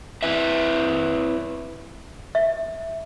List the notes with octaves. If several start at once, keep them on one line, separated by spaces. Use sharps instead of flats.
C4 E4 B4 E5
E5